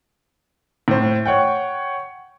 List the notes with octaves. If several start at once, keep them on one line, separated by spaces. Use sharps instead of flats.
A2 C5
C#5 F#5 G5